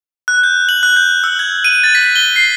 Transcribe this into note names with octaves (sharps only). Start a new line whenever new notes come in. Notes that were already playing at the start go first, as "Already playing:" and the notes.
F#6
G6
F#7
F#6
G6
E6
G#6
D#7
A6
B6
G7
C7